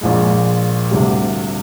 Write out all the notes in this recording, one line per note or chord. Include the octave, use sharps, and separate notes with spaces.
A#1 A#2 G#3
D2 C3 G3